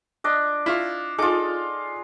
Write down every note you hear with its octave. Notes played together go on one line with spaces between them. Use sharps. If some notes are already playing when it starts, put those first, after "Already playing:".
D4 D#5
E4 F4 C#6
D#4 F4 G#4 A4 D6